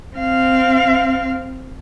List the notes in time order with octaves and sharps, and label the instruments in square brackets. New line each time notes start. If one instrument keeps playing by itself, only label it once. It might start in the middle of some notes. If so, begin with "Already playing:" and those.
[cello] C4 F5